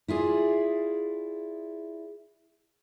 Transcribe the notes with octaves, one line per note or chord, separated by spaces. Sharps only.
E4 F4 G#4 D5